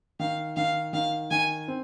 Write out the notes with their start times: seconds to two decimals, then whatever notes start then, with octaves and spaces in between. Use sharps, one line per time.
0.19 D#3 F5
0.56 D#3 F5
0.93 D#3 F5
1.31 D#3 G#5
1.68 C4